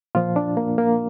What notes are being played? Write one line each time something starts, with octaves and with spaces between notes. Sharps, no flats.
A#2 F3 F4
D4
A#3
A#3